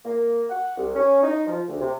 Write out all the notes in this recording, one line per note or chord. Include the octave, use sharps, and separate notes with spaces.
A#3
F#5
C2
C#4
D#4
F3
D2
C3